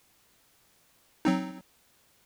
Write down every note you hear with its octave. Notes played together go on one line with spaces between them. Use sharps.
F#3 C4 D#4